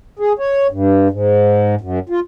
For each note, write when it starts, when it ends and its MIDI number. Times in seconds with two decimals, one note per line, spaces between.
0.19 0.33 68
0.39 0.67 73
0.71 1.08 43
1.10 1.75 44
1.81 1.99 42
2.09 2.20 65